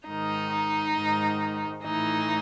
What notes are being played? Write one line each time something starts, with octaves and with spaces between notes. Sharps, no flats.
G#2 D#3 D#4
G#2 D#3
A2 E3 D#4